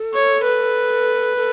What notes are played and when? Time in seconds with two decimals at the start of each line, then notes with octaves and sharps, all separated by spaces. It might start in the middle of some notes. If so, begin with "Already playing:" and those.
Already playing: A4
0.13 C#5
0.44 B4
1.37 A4